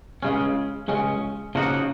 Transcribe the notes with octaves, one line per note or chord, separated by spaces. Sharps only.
C#2 C#3 G#3 C#4
C#2 C#3 G#3 C#4
C#3 F3 A#3 D#4 F#4